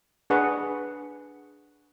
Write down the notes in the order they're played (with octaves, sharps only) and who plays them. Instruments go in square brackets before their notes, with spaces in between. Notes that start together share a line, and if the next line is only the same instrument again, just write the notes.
[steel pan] D4 G#4 B4 F#5 C#6